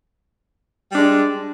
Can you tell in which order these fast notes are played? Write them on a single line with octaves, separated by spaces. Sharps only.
G3 D4 G#3